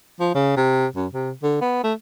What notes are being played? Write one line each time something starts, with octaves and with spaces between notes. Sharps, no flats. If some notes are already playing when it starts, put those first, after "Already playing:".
F3
C#3
C3
F#2
C3
D3
B3
A3